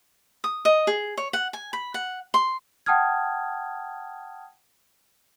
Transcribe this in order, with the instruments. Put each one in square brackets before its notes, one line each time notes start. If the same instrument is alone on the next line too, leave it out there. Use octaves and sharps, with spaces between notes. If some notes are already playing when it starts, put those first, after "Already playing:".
[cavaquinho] D#6
D#5
G#4
C#5
F#5
G#5
B5
F#5
C6
[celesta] F#5 G5 A5 D#6 F6 G#6